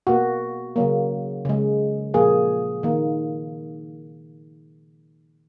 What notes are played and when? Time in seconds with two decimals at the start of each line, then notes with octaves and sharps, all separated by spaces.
0.07 B2 A#3 F#4
0.76 C#3 F#3 A#3
1.45 C#3 G#3
2.14 A#2 F3 A#3 G#4
2.83 D#3 A#3